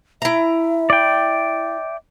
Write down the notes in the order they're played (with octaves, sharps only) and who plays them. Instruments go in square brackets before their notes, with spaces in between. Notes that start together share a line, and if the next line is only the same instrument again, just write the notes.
[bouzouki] E4 A#5 [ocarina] E5
[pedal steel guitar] D5 G5